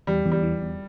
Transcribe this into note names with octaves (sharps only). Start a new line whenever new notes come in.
E2 G3
E2
G3
E3
E2